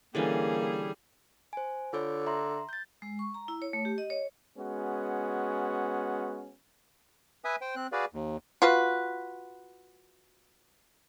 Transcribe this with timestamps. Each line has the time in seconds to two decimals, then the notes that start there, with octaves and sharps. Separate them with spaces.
0.15 D3 E3 G3 A#3 C#4 G#4
1.53 C5 G#5
1.93 D3 F4 C#5
2.26 E5 A#5 C6
2.69 G6 A6
3.02 G#3
3.19 C#6
3.34 A#5
3.48 E4
3.62 C#5
3.73 A3
3.85 G4
3.98 D#5
4.10 C#5
4.56 G#3 B3 C#4 F#4
7.45 B4 E5 G#5 D#6
7.61 C5 G5
7.76 C4 F#6
7.92 F#4 G#4 B4 D5 F5
8.13 D#2
8.62 F4 F#4 B4